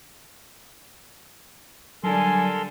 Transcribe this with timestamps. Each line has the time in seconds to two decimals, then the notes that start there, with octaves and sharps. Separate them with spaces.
2.04 D3 F#3 G3 A4 A#4 G#5 C6